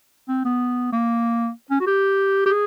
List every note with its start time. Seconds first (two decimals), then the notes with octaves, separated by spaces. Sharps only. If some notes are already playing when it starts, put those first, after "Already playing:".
0.29 C4
0.45 B3
0.93 A#3
1.71 C#4
1.81 F#4
1.87 G4
2.46 G4
2.49 G#4